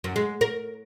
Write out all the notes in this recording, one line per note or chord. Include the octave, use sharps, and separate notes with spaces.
F#2
G#3
A#4